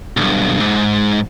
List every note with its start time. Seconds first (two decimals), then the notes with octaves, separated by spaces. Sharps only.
0.17 B1 G2
0.60 G#2